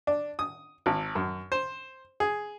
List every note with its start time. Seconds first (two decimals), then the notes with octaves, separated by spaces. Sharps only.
0.07 D4
0.39 D#6
0.86 G#1
1.15 F#2
1.52 C5
2.20 G#4